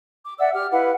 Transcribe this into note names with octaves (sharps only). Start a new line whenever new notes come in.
D6
D5 E5 F#5 E6
G4 F6
E4 B4 F5 F#5